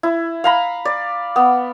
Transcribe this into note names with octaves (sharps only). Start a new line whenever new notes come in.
E4
F5 A#5 B5
D5
B3